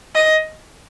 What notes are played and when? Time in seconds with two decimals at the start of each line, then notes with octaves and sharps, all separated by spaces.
0.15 D#5